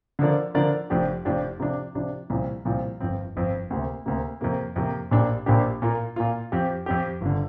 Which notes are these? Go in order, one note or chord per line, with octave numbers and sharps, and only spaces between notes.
D3 F3 D4 A#4 D5
D3 F3 D4 A#4 D5
F1 F2 F3 D4 G4
F1 F2 F3 D4 G4
C3 F3 D4
C3 F3 D4
C2 A#2 F3 C4
C2 A#2 F3 C4
G1 F2 F3 C4
G1 F2 F3 C4
D2 C3 A#3
D2 C3 A#3
F2 C3 A#3
F2 C3 A#3
A#1 A#2 A#3 D4 G4
A#1 A#2 A#3 D4 G4
A#2 A#3 F4
A#2 A#3 F4
F2 F3 C4 G4
F2 F3 C4 G4
G1 D3